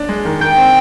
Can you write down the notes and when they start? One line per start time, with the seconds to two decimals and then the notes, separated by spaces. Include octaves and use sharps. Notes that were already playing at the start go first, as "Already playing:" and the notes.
Already playing: D4
0.09 G#3
0.25 D#3
0.41 D#3 G5
0.58 C4